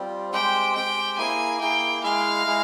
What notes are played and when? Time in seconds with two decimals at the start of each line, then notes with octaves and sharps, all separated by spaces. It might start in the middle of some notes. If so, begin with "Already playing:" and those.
Already playing: G3 C4 F4
0.32 G#3 C4 G4 C5 G5
0.75 G#3 C4 G4 C5 G5
1.18 A#3 E4 G#4 G#5
1.61 A#3 E4 G#4 G5
2.03 G#3 E4 G#4 F5
2.46 G#3 E4 G#4